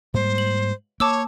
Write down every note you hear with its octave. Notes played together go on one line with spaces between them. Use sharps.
G#2 G3 A#3 C5
F#7
A#3 C#5 A5 D6 E6